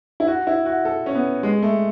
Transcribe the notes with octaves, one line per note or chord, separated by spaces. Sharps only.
E4
F#4
E4
F#4
A4
C#4
B3
G#3
A3